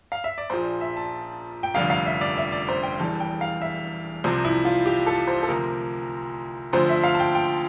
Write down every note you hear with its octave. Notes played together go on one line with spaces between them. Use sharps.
F5
E5
D5
A#1 A#2 F3 C5
E5
A5
G5
F1 F2 D3 G3 F5
F5
E5
D5
E5
D5
C5
G5
E1 E2 E3 G3 A5
G5
F5
E5
C2 C3 F3
E4
F4
G4
A4
C5
A4
D2 C3 F3 A#4
D2 D3 F3 C5
E5
F5
A5
G5
G5